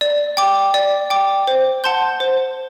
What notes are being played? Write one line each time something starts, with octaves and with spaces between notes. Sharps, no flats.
D5
G5 D6
D5
G5 D6
C5
F#5 A5 C6 G6
C5